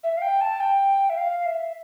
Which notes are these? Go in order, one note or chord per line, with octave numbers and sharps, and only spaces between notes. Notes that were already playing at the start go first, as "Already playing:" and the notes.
E5
F5
G5
A5
G5
E5
F5
E5